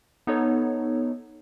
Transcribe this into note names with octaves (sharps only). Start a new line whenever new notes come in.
B3 D#4 A4 C#5